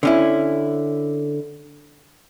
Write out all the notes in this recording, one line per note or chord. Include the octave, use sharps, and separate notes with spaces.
D3 C#4 E4